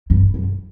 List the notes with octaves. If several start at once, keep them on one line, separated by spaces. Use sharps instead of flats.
G2
F#2